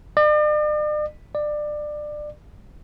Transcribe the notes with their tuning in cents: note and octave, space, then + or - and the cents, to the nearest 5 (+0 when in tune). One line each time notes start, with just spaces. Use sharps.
D5 +45
D5 +25